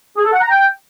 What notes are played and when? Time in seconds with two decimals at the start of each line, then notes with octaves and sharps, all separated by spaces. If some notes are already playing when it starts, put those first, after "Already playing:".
0.17 G#4
0.25 A4
0.33 F#5
0.41 A#5
0.49 G5